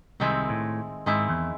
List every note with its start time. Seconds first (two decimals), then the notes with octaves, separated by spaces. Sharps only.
0.20 C2 C3 D#3 G#3 C4 E4
0.49 A2
1.06 G#2 D#3 G#3 C4 E4
1.29 E2